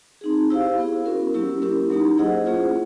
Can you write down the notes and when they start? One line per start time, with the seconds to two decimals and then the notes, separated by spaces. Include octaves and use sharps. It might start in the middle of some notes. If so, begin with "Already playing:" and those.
0.21 C4 D#4 G#4
0.50 E4 G4 C5 F5
0.78 B3 E4 G#4
1.06 C#4 F#4 A#4
1.34 F#3 A#3 C#4 E4 G4
1.62 C#4 E4 G4 A#4
1.90 F#3 A#3 D#4 G4
2.18 E4 G#4 C5 D#5 F#5
2.46 A#3 C#4 F4 G#4 C5